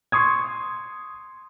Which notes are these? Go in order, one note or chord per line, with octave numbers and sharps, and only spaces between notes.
C6 C#6 D#6 G#6